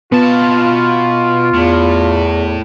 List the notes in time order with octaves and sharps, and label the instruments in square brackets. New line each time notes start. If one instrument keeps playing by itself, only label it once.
[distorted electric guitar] B2 A5 [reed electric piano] B3 [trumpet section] F4
[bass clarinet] E2 [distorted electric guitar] A2